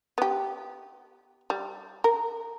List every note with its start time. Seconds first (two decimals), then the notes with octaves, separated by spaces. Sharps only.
0.18 B3 G4
1.50 G3
2.04 A#4